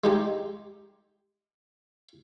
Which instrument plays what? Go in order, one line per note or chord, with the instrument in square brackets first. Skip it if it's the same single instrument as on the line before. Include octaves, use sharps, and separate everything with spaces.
[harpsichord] G#3 D#4 G4